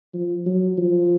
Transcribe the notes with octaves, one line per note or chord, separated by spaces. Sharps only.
F3
F#3
F3